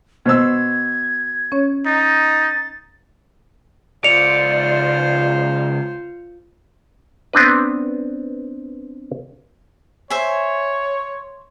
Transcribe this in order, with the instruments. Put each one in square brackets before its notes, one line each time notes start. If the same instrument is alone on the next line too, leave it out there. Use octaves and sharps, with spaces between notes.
[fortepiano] B2 C5 E6 [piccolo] G#6
[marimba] C#4 C#5
[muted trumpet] D#4 [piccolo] A6
[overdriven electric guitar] C#2 D5 [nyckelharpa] F4 C5 [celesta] C#7 F7
[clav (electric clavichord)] B3 C4 D4 B4
[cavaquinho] C5 E5 G#5 [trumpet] C#5